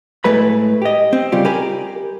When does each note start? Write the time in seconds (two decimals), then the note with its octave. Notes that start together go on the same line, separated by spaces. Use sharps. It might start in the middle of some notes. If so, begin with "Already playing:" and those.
0.24 A2 G#3 A3 B4 B5
0.82 G4 D#5
1.13 C4
1.32 C#3 G3 F4 G4
1.45 G4 A#4 G#5 B5